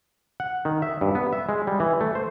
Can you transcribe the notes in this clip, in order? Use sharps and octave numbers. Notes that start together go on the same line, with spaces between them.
F#5
D#3
E5
G2
B3
E5
G#3
G3
E3
A3
C5